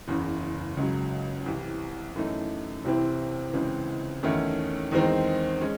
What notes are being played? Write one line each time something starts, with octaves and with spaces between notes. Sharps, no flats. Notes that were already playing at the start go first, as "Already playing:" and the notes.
F#1 E2 C#3 E3
C#2 C#3 F#3
C2 C3 E3
F#2 E3 A3 D#4
C2 C3 E3 C4 E4
C#2 C#3 E3 C4
E2 D#3 A3 C#4 E4
E2 D#3 G#3 C4 D#4
G#3 C#4